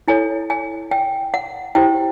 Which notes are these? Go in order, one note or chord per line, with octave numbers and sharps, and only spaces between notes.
E4 A4 C#5 G#5
G#5
G5
F#5
E4 G4 C5 G5